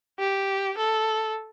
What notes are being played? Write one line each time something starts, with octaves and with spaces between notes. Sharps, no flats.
G4
A4